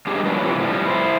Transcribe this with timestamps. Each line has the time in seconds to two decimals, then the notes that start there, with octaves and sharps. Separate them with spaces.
0.07 G3 D4 D#4 F4 G4 G#4
0.26 F3 F#3 A#3 D4 F#4 B4
0.43 C3 E3
0.58 A2 F3 G3
0.86 E4 B4 C5